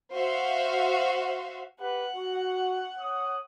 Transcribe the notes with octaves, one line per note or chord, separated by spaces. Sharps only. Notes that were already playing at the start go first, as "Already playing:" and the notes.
F#4 C5 E5 F5
G4 B4 F#5
F#4
C#5 D#6